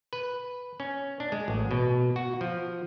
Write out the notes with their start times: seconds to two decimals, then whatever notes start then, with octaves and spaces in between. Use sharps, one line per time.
0.13 B4
0.80 C#4
1.20 D4
1.32 G#3
1.48 A1
1.71 B2
2.16 F#4
2.41 F3